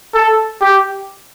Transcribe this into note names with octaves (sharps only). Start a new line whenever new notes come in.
A4
G4